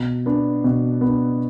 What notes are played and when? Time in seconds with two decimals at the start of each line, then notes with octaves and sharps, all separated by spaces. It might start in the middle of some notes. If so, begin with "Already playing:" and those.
Already playing: B2
0.26 B3 D4
0.64 B2
1.01 B3 D4